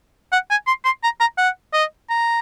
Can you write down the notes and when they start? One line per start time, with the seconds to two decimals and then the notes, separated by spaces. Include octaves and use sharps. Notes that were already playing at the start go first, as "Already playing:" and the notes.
0.32 F#5
0.50 G#5
0.67 C6
0.85 C6
1.03 A#5
1.20 A#5
1.38 F#5
1.73 D#5
2.10 A#5